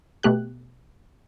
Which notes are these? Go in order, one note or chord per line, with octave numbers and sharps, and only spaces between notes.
B2 A3 G4 F#6